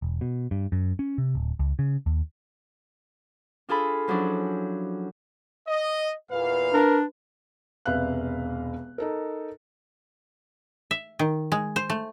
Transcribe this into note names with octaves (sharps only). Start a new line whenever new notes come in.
E1
B2
G2
F#2
C#4
C3
D1
C#2
C#3
D#2
D4 F4 G#4 A4 B5
F3 F#3 C#4 D4 E4
D#5
E2 A#2 B4 F5
D4 A#4
E1 C2 B4 E5 F5 F#6
D#4 A4 A#4
E5
D#3
G#3
C5
A3